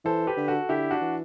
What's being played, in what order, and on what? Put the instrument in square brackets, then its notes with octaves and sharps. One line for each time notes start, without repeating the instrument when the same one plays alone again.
[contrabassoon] E3 [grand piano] A4 C5
[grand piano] G4 B4
[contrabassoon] D3
[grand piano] F#4 A4
[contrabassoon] D3 [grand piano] E4 G4
[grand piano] D4 F#4
[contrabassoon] E3